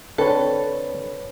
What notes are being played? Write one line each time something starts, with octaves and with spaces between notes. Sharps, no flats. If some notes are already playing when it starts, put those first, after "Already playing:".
D3 C4 A4 B4 C#5